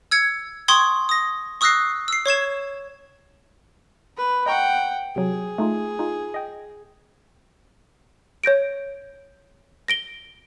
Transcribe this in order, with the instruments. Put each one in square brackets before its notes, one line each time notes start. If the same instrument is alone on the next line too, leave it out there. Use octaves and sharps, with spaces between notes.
[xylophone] E6 G#6 C#7
G5 C6 C#6 D#6 G#6
D#6 A#6
C#6 D#6 E6 F#6 A#6 C7
E6 C7
C#5 C#6 G#6 E7
[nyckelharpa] B4
[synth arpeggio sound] D#5 A#5 C#6 [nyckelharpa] F#5 G5
[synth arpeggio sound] C3 F#3 [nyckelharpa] G#4
[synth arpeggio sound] A3 D#4 F4
D#4 F4
D#5 G5
[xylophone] C#5 G6 A#6 D7
A#6 D7 G7